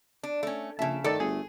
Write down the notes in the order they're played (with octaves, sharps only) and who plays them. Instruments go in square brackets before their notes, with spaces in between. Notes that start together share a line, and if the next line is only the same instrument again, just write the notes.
[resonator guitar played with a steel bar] D4
A3 C#4
[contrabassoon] A#1 [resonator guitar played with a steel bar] C#3 A5 [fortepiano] E5
[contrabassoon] D#3 [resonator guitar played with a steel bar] A3 [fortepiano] A4 D5 A5
[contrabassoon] G1 [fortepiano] G#4